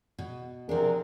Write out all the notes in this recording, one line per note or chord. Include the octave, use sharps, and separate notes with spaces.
B2
C3 F3 D4 G#4 A#4